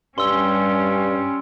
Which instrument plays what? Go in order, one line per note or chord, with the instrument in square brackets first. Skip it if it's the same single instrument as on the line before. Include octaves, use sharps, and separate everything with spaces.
[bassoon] G2 [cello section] G3 C#4 [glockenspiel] C6 E6 G7